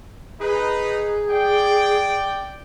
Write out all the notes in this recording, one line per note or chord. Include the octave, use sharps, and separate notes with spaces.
D#4 G#4 B4
D5 G5